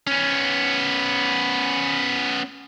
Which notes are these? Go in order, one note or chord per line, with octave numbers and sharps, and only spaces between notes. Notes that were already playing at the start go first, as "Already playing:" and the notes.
B3 C#4